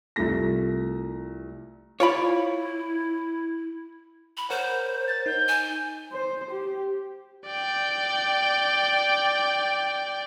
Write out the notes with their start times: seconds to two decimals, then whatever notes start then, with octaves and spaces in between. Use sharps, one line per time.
0.16 C2 F3 A3 A#6
2.00 E4 F4 C#5 D5 B5
4.37 B5
4.50 A#4 C5 C#5 F#5
5.07 A6
5.26 D#4 G6
5.48 G#5
6.12 C5
6.51 G4
7.47 D5 G5